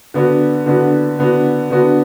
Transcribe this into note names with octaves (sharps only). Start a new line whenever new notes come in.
D3 B3 D4 F#4
D3 B3 D4 F#4
D3 B3 D4 F#4
D3 B3 D4 F#4